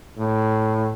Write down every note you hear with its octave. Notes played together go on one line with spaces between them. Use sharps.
A2